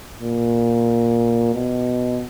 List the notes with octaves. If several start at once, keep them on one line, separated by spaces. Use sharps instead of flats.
A#2
B2